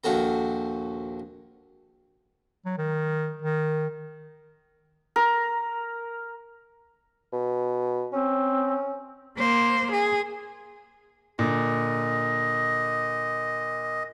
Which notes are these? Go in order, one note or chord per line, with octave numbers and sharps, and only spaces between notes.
A#1 D#2 F#4 A4 A#5
F#3
D#3
D#3
A#4
B2
C4 C#4
A#3 C5
G#4
A#2 D3 D#5